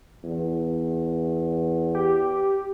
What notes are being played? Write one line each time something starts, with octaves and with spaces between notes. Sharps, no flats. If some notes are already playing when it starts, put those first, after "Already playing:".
E2
G4